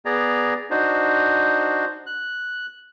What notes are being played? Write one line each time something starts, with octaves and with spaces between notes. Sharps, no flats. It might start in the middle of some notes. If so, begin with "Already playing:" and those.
B3 G#4 D5 A#5
D4 D#4 F#4 C5
F#6